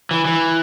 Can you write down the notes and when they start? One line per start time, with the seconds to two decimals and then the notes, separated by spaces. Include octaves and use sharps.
0.11 E3
0.25 E3